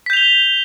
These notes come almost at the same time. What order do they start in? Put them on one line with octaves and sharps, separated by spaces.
B6 G6 F7 G7